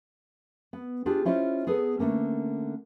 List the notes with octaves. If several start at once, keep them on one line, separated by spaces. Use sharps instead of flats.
B3
D4 F4 G4 G#4
C#4 E4 F4 C5 C#5 D#5
B3 G#4 A4 B4
D3 A3 A#3 C#4